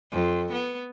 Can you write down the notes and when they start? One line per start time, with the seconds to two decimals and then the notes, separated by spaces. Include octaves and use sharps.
0.12 F2
0.52 B3